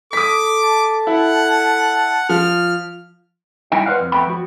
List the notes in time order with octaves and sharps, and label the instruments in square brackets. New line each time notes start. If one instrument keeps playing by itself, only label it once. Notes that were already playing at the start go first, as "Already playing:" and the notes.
[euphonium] A4 [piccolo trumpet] D6 [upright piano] D#6 B6
[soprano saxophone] A5
[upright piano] E4 [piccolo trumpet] F#5
[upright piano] F3 [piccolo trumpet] F6
[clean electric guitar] G3 D#4 E4 A#4 D#5 G5
B4 C5 D5 D#5 F5 F#5
F2
F2 A3 B3 G5 B5
F3 F#4